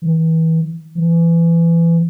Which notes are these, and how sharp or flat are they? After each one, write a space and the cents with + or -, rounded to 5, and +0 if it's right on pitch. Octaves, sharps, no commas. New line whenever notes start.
E3 -30
E3 +25